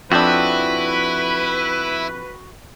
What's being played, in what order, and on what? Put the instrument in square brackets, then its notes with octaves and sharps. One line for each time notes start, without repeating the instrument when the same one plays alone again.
[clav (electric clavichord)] F2 D4 [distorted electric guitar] E4 [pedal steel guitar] F#4 G5 G6 [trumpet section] B4